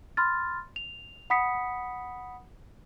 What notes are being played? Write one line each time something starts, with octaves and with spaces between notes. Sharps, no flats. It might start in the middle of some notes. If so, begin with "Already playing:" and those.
B5 C6 F6 A6
F7
F#5 B5 D#6 B6 C#7